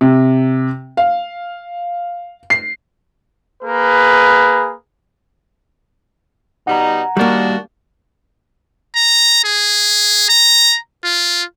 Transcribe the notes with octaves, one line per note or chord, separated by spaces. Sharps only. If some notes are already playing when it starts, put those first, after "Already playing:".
C3
F5
C7
A#3 G#4 B4
B2 G3 D#4 F#5 A#5
D#3 G3 A#3 D4 F#4
A#5
G#4
A#5
F4